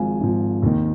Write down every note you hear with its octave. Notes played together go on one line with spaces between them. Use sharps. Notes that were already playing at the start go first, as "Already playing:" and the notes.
Already playing: G#1 G#2 F3 F5 G#5
G#1 G#2 F3
D#2 D#3